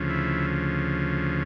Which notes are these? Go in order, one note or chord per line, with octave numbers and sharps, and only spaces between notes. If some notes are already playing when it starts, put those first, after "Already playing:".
Already playing: D2 C#3 F3
E4